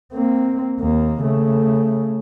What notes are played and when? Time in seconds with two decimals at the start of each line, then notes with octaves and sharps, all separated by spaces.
0.13 A#3 C4
0.80 D#2 A#3
1.21 C#3 A3